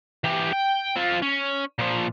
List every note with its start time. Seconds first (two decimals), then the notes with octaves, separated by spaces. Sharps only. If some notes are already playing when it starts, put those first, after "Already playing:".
0.24 E3 G4
0.53 G5
0.96 C4 F4
1.22 C#4
1.79 A#2 F3